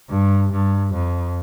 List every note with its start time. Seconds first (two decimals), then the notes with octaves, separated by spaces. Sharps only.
0.09 G2
0.52 G2
0.94 F2